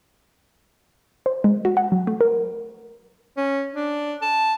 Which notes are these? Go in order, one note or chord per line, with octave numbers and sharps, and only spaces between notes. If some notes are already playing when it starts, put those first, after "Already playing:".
C5
G#3
F#4
F#5
F#3
A3
A#4
C#4
D4
A5